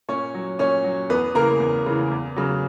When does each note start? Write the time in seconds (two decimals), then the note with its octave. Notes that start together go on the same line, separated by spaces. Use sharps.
0.08 A#2 C#4 C#5
0.34 F#3
0.59 A#2 C#4 C#5
0.84 F#3
1.10 E2 B3 B4
1.35 C#3 E3 A#3 A#4
1.60 E2
1.86 C#3 E3
2.11 E2
2.36 C#3 F#3